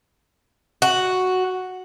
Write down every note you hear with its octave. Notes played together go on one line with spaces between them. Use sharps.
F#4